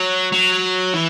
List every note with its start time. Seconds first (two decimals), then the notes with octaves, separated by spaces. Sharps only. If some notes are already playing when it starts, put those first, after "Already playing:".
Already playing: F#3
0.32 F#3
0.94 E3